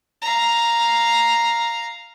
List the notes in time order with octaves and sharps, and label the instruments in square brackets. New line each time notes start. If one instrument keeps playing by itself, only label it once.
[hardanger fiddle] F5 A#5